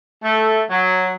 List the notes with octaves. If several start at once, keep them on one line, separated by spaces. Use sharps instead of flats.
A3
F#3